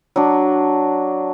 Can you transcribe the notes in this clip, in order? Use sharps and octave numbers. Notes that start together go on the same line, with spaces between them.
F#3 D4